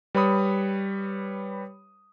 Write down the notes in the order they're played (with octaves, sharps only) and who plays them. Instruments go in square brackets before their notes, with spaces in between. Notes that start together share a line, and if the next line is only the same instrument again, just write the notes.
[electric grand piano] G3 B4 C#5 B5 D#6